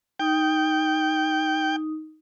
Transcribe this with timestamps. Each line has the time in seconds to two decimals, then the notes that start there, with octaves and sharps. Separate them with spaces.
0.20 D#4 G5 D#6